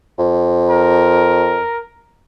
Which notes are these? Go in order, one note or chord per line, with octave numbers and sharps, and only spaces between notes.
F2
A#4